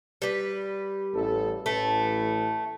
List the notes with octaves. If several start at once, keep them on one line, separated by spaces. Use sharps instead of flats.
G3 B4
A1 A4
A1 A2 A3 B4